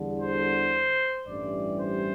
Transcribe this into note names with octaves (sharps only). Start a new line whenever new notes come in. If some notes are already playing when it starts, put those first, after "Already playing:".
Already playing: E2 D3 G3
C5
A1 G2 E3 G3 D5
C5